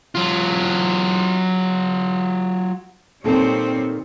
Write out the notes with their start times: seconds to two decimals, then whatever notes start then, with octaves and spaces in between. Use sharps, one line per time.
0.15 F#3 F4
3.24 A#2 D#3 G3 C4 A4 C#5